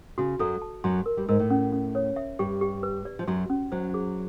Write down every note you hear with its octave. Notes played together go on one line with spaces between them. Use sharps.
C#3 F#4
F#2 F#3 A4
A5
F#2 F#3 C6
A#4
G2 G3
G#2 G#3 A#4
A2 A3
C#4
C#4
C#5
E5
G2 G3 G4
G4
B4
D5
F3
F#2 F#3 F#4
C#4
F#2 F#3 C5
G#4